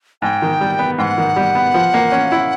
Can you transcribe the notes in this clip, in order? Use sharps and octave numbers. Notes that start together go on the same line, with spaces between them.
G#2 G5
D#3
G3
B3
G#2 F#5 G5
D#3
G3
B3
F3
A#3
C#4
E4